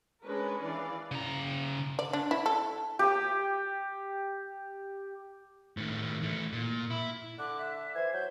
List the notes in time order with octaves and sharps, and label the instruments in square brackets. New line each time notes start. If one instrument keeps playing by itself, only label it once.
[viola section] G#3 C#4 D4 A#4 B4
E3 D5 F5
[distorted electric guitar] C#3 A#5
[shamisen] D5
D4
E4
A4
[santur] G4 D#6
[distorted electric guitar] A2 D#3
E3 A3
A#2
E4
[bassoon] D3 [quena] D6 [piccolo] F#6
[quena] E5
[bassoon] E3 [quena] C5 [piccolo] G#6
[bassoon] F#3 [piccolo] G6